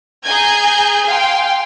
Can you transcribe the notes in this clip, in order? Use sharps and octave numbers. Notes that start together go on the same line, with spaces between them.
G#4 G#5 A#5 G6 G#6
F5 G5 G#5 C6